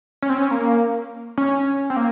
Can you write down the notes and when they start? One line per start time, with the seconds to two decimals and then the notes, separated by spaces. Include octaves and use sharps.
0.22 C#4
0.30 C4
0.38 C#4
0.51 A#3
1.38 C#4
1.90 C4
1.96 A#3